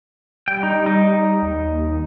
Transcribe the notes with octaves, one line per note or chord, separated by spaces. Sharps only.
G3 G5
D#4
D#4
D#2